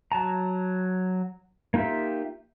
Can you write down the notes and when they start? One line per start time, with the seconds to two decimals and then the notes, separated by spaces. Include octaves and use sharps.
0.12 F#3 A5 A#5
1.74 A#3 D#4 F4 G4 E5